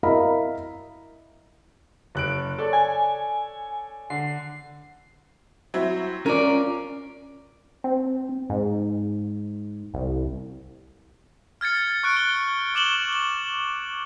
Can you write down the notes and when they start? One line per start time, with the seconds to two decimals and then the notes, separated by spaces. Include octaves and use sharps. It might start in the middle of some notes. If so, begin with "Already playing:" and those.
0.03 E4 A#4 D#5 F5 A#5 B5
2.15 F#1 F#6 D7
2.58 A4 C#5 D5
2.73 G#5
4.10 D3 C7
5.74 F#3 C4 E4
6.26 C#4 F4 A#4 D5
7.84 C4
8.50 G#2
9.94 C2
11.61 F6 G#6 A6 C#7
12.03 C#6 F#6 D7
12.17 G7
12.74 C#6 D6 E7 F#7 G7
13.13 G7